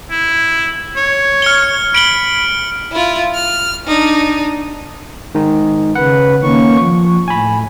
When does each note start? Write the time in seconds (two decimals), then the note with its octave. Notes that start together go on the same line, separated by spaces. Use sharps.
0.11 E4
0.97 C#5
1.42 F6 C#7 G7
1.95 B5 D7 F#7 G7
2.92 E4 F4
3.34 F6
3.87 D4 D#4
5.35 D#3 G#3 D#4
5.95 C#3 B4 F#5
6.43 D#3 A#3 C#4 C#6
6.77 F3 C#6
7.28 A2 G#5 B5